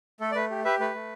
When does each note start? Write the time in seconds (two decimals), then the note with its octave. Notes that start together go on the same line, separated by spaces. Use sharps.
0.20 A3 A4
0.32 D5
0.35 A3 B4
0.50 G4
0.65 G4 B4 E5
0.79 A3 B4
0.94 A3